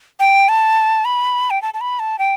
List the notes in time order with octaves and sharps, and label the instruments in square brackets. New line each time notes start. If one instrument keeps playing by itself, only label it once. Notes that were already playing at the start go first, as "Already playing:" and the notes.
[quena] G5
A5
B5
G5
A5
A5
B5
A5
G5